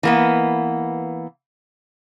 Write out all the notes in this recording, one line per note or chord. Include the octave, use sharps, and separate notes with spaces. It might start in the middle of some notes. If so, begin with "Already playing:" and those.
E3 A#3 B3